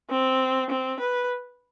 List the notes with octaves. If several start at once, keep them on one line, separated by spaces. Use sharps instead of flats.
C4
C4
B4